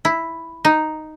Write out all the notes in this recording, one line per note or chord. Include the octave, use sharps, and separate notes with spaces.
E4
D#4